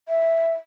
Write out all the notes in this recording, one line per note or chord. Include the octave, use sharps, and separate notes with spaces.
E5